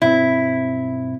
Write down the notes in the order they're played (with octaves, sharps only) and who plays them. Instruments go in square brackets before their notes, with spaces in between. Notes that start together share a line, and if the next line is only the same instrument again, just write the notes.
[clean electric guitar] B1 G2 C4 [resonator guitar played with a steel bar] E4